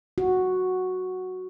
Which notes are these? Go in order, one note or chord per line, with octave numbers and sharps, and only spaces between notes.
F#4